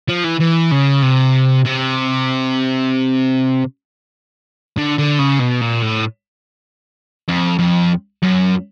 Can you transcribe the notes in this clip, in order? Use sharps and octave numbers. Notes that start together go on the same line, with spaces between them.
F3
E3
E3
C#3
C3
C3
D3
D3
C#3
B2
A#2
A2
F2
F2
F#2